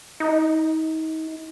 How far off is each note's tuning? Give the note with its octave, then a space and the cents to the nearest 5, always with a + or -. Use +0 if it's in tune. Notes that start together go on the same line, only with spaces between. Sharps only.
D#4 +35